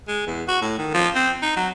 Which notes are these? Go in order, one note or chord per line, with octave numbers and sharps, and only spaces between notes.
G#3
E2
F#4
A2
D#3
F3
C4
D#4
F#3